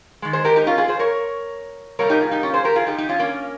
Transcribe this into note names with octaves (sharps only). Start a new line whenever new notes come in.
D#3 G#3
G#4 C5
G4 A#4
D#4 G4
C#4 F4
F4 G#4
G#4 C5
A#4 C#5
C3 G3 A#3 A#4 C#5
D#4 G4
F4 G#4
D#4 G4
C#4 F4
G#4 C5
G4 A#4
F4 G#4
D#4 G4
D#4 G4
C#4 F4
A#3 C#4